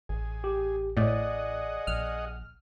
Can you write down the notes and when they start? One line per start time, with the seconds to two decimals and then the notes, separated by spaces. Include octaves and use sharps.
0.09 A1 G#4
0.44 G4
0.97 A2 G#4 D5 D#5 F#5
1.87 A#1 F6